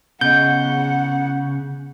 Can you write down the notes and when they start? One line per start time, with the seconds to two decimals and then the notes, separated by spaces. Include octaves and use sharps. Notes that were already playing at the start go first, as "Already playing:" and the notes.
0.21 C#3 B3 D#5 F#5 G6